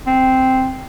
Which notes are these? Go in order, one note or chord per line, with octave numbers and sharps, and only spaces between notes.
C4